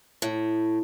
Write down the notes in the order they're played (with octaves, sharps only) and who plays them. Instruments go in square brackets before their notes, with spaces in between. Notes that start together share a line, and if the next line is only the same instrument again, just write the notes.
[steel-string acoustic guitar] A2